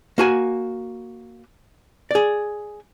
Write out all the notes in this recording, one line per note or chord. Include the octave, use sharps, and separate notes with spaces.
A#3 F#4 G#5
G#4 D5